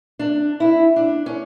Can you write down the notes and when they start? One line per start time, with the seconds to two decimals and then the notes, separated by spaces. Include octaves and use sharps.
0.19 D4
0.60 E4
0.96 D4
1.26 C#4